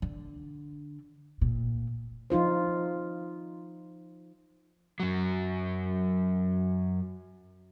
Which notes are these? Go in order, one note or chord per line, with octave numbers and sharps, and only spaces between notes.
D3
A#2
F3 D#4 F4 C5
F#2 F#3